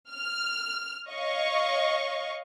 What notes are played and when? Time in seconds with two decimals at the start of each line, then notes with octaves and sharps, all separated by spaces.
0.11 F6
1.09 C#5 D#5 F5 C#6